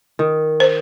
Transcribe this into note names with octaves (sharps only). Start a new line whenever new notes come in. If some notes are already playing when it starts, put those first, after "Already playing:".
D#3
C5